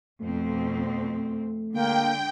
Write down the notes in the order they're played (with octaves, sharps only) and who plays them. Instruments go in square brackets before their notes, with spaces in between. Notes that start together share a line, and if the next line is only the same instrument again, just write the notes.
[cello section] F2 B2 C4 [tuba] A3
[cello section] D3 G#3 [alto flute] A#3 [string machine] G5